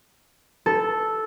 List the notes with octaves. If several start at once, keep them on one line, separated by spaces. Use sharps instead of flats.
A4